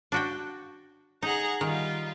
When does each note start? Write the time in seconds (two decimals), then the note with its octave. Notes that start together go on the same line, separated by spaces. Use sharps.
0.12 D4 F#4 G5
1.22 D#4 G#4 F#5 A#5
1.61 D#3 G3 D#4 F4